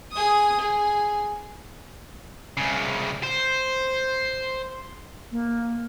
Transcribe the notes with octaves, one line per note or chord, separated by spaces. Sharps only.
G#4 D#6
G#4
C2 C#3
C5
A#3